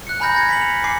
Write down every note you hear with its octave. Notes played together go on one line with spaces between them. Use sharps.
F#6 C#7
G#5 A#5 B5 F6 G6 A#6
G#6 A#6 C#7
B6 C#7 F#7
F7
G#5 D6 C7 C#7